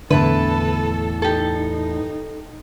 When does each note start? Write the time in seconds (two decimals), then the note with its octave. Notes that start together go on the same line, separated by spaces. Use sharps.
0.10 E2 A2 D3 E4 A4 B4 A5
1.22 D#4 G4 A4